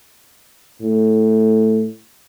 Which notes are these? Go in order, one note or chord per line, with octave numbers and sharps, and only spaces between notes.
A2